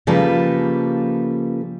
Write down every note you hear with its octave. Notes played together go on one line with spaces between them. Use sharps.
C#3 F3 G3 A#3 A4 B4